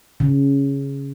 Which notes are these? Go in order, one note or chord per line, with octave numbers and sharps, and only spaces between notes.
C#3